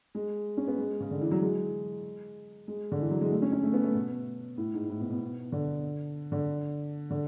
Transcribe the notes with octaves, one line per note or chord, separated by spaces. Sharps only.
G#3
C#4
B3
G#3
C#3
D3
E3
F#3
G#3
G#3
D3
E3
F#3
G#3
A3
C#4
C#4
A3
B3
A3
B2
A2
G#2
A2
B2
B2
D3
D3
D3